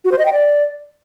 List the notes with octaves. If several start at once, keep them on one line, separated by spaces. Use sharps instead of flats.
F#4
C5
D#5
G5
D5